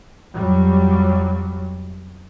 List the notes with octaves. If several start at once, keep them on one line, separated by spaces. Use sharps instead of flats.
F2 F#3 G3